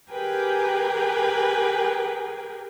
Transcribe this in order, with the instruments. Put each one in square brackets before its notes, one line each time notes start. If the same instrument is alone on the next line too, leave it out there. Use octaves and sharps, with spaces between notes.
[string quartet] G4 G#4 A#4 B4 G5 G#5